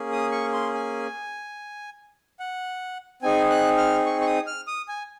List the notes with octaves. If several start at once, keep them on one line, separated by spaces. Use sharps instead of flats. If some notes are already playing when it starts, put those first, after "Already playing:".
Already playing: A#3 C#4 G#4
D#6
C#6
C6
G#5
F#5
C4 D#4 G#4 G#5
F#6
F6
C#6
C#6
D#6
F6
D#6
G#5